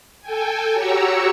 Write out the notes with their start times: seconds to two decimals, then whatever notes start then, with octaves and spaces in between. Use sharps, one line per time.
0.21 A4 G5 G#5
0.74 F#4 G4 C#5 A#5 C#6 E6